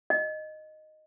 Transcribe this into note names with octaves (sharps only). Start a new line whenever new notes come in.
D#5